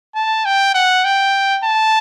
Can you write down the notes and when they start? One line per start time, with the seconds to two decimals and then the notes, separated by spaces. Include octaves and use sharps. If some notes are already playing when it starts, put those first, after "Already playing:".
0.15 A5
0.45 G5
0.74 F#5
1.04 G5
1.64 A5